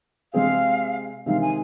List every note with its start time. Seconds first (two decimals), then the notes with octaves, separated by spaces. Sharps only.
0.33 C3 G#3 C4 G#4 F5
1.26 C3 D#3 G#3 F5
1.42 G#5